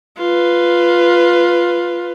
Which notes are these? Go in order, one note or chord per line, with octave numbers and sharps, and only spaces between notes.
F4 B4